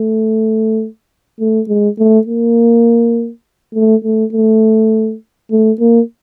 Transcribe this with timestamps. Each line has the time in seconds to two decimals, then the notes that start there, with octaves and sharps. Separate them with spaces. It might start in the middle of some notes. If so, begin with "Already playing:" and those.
Already playing: A3
1.40 A3
1.68 G#3
1.99 A3
2.27 A#3
3.75 A3
4.04 A3
4.33 A3
5.51 A3
5.80 A#3